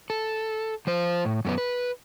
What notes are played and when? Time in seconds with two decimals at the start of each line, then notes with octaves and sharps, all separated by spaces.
0.10 A4
0.87 F3 C5
1.25 A2
1.45 F#2 A3 B3
1.58 B4